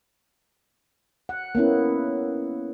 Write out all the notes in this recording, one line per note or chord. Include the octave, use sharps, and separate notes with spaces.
F#5
A#3 B3 C#4 E4